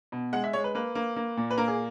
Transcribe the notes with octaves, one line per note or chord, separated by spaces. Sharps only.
B2
G#3 F#5
E5
G#3 C#5
B4
A#3 B4
A#3
A#3
A#2
B4
A#3 A#4
G#4